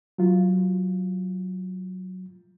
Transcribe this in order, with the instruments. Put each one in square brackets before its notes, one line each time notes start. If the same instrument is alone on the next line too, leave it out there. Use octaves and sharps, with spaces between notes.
[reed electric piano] F#3 F4